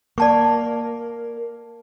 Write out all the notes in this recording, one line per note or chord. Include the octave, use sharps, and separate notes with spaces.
A#3 D5 A5 C#6